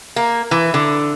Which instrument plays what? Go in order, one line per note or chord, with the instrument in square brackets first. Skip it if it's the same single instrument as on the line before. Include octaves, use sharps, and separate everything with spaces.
[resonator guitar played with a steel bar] A#3
E3
D3